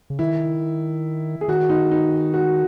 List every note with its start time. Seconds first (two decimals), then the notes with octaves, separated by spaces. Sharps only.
0.10 C#3
0.19 D#3 E4
1.41 G#4
1.48 D#3 F#4
1.69 D#4
1.91 D#4
2.34 F#4